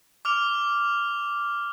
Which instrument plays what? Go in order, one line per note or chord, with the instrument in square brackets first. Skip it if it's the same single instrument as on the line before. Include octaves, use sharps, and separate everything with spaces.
[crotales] D6 F6 F7